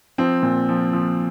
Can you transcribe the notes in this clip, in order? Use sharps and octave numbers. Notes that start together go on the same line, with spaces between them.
F3 C4
A#2
F3
F3